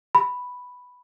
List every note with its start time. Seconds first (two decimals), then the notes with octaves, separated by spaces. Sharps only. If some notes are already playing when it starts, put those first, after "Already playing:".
0.15 B5